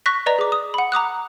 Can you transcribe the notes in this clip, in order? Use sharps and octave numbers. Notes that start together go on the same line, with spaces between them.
C#6 F#6 A#6 B6
B4 D5 D#5 A#5
G#4 D6
D#6
F#5 B5
A#5 D6 D#6 F#6